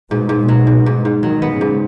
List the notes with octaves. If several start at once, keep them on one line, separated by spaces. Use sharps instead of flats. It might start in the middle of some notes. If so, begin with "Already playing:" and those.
G#2 B2
G#2
B2
F#3
G#2
G#2
G#2
D#3 F#3
B3
C#3
G#2